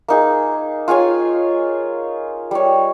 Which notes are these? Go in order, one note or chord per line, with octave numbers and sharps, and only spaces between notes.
A#3 D#4 G#4
F4 G#4 C#5 G#5
G3 C#5